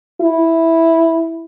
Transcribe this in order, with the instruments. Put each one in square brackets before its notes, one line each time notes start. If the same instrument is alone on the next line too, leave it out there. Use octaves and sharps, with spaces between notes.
[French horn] E4